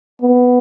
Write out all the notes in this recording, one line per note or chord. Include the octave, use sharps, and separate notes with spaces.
B3